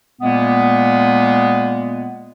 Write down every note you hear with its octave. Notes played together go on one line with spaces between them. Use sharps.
A#2 G#3 A#3 B3